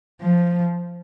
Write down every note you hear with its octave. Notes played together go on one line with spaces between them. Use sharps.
F3